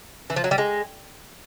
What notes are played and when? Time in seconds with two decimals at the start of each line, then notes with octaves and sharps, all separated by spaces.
0.30 E3
0.36 F3
0.44 F#3
0.51 G3
0.58 G#3